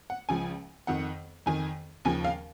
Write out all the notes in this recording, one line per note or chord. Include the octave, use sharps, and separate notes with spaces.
F#5
C#2 C#3 F3 G#5
F2 D#3 F#5
F2 D#3 G#5
D#2 C#3 F3 G#5
F5